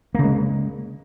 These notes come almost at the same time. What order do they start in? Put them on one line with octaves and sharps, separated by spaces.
A#3 C#3 G#3